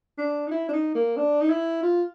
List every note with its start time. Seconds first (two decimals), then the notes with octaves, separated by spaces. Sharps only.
0.18 D4
0.47 D#4
0.51 E4
0.69 D4
0.73 D#4
0.95 A#3
1.17 D4
1.41 D#4
1.50 E4
1.83 F4